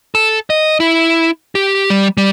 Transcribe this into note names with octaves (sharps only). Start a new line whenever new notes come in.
A4
D#5
E4
G4
G3
G3